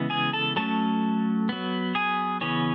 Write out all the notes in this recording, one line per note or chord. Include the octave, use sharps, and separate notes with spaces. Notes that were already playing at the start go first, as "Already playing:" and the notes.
Already playing: C#3 E3 G#3 B3
G#4 G#5
A4 A5
F#3 A3 C#4 A4 A5
F#3 B3
G#4 G#5
C#3 E3 B3 C#4 C#5